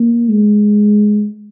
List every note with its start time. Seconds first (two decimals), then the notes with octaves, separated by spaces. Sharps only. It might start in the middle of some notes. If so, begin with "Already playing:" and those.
Already playing: A#3
0.29 G#3